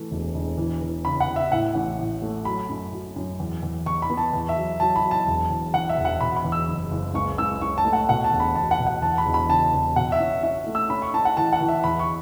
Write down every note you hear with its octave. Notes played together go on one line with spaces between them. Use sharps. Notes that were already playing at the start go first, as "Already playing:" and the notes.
Already playing: E3 A3
E1
E1
E3
E3
C#3 B5
F#5
C#3
E5
A2 F#5
A1
A2
A3
F#3 B5
F#2
F#3
F#2
E2
E2
E2 C#6
B5
B3
A5
E2
E5
F#3
F#3 A5
B5
F#3
A5
E1
E2
E2 F#5
E5
E1
F#5
B2 B5
B5
E2
E6
F#1
F#1
C#2 C#6
C#2 E6
C#4 C#6
A5
A3
F#5
B2 F#5
A5
E1
B5
E1 A5
F#5
B2
F#5
E2 A5
B5
E1
B5
C#3 A5
E2
B2 F#5
E5
C#4
C#4 E5
A3
E6
C#4 B5
C#6
C#4 A5
F#5
E3 A5
F#5
E3
E5
E2 B5
C#6